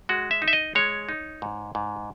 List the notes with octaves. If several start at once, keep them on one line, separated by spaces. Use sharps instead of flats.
G#3 F#4
E5
D#4
E5
D#5
G#3 C#5
D#4
G#2
G#2